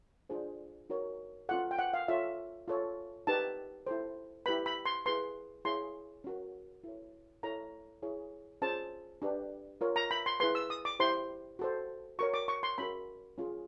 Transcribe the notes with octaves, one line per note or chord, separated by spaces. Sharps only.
D4 F4 G#4 C5
D#4 F#4 A#4 C#5
C#4 F4 A4 F#5
G5
F#5
F5
F4 A4 C#5 E5
F4 A4 C#5
D#4 G4 B4 A5
E4 A4 C5
E4 G4 B4 B5
B5
C6
E4 G#4 B4 C6
E4 G#4 C#5 C6
C#4 F#4 A#4
E4 A4 C#5
E4 A4 C#5 A#5
E4 G#4 C#5
C#4 F4 G#4 C5 A5
D4 G4 B4
F4 A#4 C#5
A#5
B5
C6
E4 G#4 B4 C6
E6
D#6
D6
E4 G4 C5 C6
F#4 A4 C5
F#4 A#4 C#5 C#6
D6
C#6
C6
C#4 F#4 A#4 B5
C#4 F4 G#4